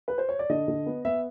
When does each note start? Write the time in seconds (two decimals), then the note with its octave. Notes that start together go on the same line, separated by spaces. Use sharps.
0.08 B4
0.18 C5
0.29 C#5
0.39 D5
0.50 D3 D#5
0.68 D3
0.86 B3
1.05 B3 E5